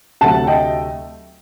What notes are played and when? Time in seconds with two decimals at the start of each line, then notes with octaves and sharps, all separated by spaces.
0.21 D2 C3 F#3 A3 F#5 A5
0.47 D#5 G5